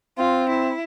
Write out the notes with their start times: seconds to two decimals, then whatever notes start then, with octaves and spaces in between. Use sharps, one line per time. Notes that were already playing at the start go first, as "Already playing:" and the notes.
0.18 C4 F4
0.49 E4